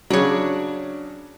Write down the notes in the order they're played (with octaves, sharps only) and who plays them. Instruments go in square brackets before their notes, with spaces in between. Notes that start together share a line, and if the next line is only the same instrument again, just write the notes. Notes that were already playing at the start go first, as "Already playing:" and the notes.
[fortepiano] C#3 F#3 [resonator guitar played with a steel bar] D4 C#5